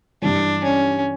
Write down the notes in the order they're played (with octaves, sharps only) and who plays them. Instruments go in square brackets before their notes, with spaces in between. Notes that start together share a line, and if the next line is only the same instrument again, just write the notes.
[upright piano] G2 E3 G3 [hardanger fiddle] D4
[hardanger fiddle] C#4